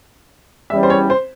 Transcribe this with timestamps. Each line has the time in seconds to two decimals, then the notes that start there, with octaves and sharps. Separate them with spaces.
0.70 E2 E3 G3 C#4 E5
0.83 C5
0.90 C#5
1.10 C5